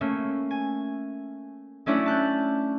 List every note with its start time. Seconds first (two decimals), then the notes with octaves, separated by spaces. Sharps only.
0.01 A3 A#3 C#4
0.51 G#5
1.86 F#3 A3 C#4 D4 E4
2.06 A5 F#6 G6